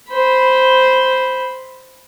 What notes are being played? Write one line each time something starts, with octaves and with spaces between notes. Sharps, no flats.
C5 B5